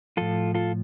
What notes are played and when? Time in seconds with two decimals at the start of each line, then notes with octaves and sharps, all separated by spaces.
0.17 A2 F3 F4 A4
0.55 F4 A4